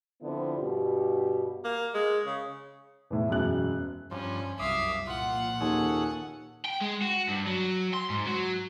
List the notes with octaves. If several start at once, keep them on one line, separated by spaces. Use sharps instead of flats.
D3 F3 B3 C4 E4
G2 B2 G4
A#3
G#3
C#3
E2 A2
E1 F#2 F#6
G2 F3 C#4
C2 F#2 E5 F5 D6 D#6
A#2 F3 F4 F#5
D#2 C#4 G#4 A4
G5
G#3
F#4
G2
F#3
C6
G#2
F#3